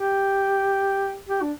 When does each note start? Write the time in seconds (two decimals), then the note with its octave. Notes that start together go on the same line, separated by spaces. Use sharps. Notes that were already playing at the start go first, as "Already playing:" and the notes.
Already playing: G4
1.29 G4
1.42 D4